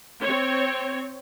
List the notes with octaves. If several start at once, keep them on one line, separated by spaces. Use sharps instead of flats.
C4 C#5